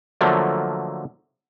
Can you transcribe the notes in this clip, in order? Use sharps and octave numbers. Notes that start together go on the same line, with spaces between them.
D3 F3 F#3 A3 A#3